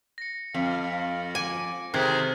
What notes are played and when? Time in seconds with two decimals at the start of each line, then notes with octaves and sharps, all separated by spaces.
0.18 A#6 C#7
0.54 F2 F5
1.35 G#5 D6
1.94 C3 D#3 G#3 A4 F#6 G#6